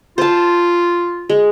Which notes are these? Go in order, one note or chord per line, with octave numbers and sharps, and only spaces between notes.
F4 C5 A5
G#3